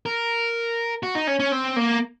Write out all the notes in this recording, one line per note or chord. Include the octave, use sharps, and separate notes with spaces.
A#4
F#4
D#4
C#4
C#4
C4
A#3